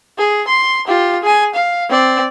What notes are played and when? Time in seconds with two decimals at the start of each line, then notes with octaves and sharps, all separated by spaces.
0.18 G#4
0.47 C6
0.87 F4 G4
1.23 G#4 G#5
1.54 F5
1.90 C4 D5